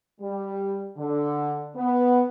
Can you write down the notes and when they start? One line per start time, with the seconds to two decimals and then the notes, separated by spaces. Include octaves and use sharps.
0.20 G3
0.97 D3
1.75 B3